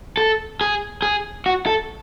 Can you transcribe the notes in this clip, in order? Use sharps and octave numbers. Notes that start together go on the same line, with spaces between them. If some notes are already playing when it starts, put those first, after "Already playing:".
A4
G#4
G#4
F#4
A4